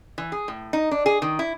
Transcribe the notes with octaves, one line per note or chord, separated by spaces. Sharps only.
E3
G#4
A2
D#4
D4
G#4
D#3
E4